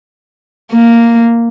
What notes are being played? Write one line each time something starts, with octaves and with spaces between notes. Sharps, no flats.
A#3